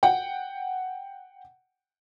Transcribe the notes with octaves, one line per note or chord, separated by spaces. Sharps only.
F#5 G5